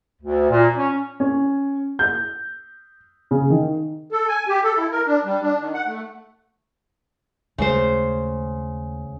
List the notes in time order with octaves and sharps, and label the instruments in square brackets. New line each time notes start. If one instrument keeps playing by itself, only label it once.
[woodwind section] D2
A#2
C#4
[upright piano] C#4
G6
C#3
D#3
[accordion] A4
G#5
G4
A4
E4
A#4
D4
G3
D4
D#3
F#5
A3
[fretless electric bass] D#2 G#3 A3 [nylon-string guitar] C#3 C5